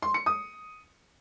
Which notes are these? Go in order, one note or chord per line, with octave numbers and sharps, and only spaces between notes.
C6
C#7
D#6